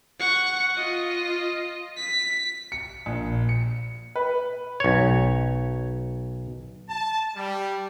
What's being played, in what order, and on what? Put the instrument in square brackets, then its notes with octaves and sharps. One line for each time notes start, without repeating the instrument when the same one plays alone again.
[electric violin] F#5 C#6
F4 D#5
B6
[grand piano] C#7
A#1
C#7
B4
[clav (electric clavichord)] B1 C#5
[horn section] A5
G3